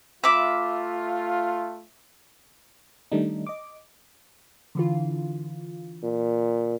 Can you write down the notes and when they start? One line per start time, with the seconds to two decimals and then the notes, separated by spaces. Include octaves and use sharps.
0.24 A3 F4 E5 B5 D6
3.12 D#3 G3 A3 D4 D#4
3.47 D#5 D6
4.75 D3 E3 F4
6.03 A#2